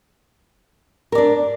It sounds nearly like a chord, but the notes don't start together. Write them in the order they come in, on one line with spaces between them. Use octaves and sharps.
A#4 D5 D4